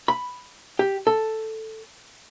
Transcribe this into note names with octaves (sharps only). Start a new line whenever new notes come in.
B5
G4
A4